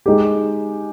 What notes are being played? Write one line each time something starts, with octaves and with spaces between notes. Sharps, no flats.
G#3 D#4 G4